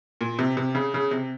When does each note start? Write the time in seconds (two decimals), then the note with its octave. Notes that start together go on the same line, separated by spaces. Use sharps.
0.21 A#2
0.39 C3
0.57 C3
0.75 C#3
0.94 C#3
1.11 C3